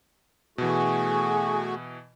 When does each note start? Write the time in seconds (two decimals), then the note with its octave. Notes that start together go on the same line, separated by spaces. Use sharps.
0.58 B2 E3 A3 F#4 G#4